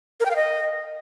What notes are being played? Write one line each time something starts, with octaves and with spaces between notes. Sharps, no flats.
A#4
G5
F5
D#5